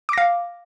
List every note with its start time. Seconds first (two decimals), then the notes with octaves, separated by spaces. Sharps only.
0.09 D6
0.13 A#6
0.18 F5